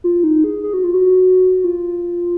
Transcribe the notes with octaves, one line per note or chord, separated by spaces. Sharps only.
F4
D#4
G#4
G#4
F#4
F4
F#4
F4